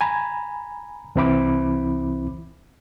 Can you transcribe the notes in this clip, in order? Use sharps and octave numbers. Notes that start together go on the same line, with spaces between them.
G#5 A#5 B5
C2 E3 C4 E4 B5 D6